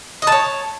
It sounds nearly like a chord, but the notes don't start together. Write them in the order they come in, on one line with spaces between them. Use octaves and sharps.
D#5 A5 C#5